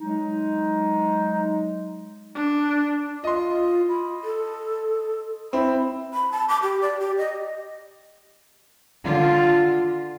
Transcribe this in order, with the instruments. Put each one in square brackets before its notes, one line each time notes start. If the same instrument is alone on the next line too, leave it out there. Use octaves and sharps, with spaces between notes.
[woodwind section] F#3 G#3 D#4
[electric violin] D4
[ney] F4 [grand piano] D#5 C6
[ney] B5
A4
[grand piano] C4 E4 [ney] B5
[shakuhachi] B5
A5
D6
G4
D5
G4
D#5
[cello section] D3 F4